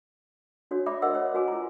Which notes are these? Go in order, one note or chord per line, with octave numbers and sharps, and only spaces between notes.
D4 F#4 C#5
D5 E5 B5 D6
A#4 C5 D#5 F#5 E6
C5 C#5
F#4 B4 G#5 D6
F4 A#5